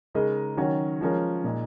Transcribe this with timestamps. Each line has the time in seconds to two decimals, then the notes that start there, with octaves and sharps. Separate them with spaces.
0.15 C#3 G#3 D#4 A#4 D#5
0.57 D#3 F#3 C#4 F#4
1.01 F3 G#3 C#4 F4 A#4
1.44 A#2 G#3 D#4 G#4